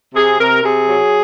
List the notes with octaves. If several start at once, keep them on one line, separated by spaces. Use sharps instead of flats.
C3 G#4
C3 A#4
C3 G#4
F#3